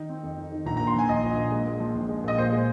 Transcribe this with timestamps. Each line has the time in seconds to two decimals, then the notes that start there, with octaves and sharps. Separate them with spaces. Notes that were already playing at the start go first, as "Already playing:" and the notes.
Already playing: D#3 D#4
0.09 C4
0.23 F2
0.37 D#4
0.52 D#3
0.66 A#1 A#5
0.77 A#5
0.80 A#2
0.87 C6
0.95 F3 G#5
1.09 A#1 D#5
1.23 A#1
1.37 A#2
1.51 G#3
1.66 A#2
1.80 F3
1.95 A#1
2.09 G#3
2.24 A#2 D#5
2.38 A#2 C5
2.52 G#3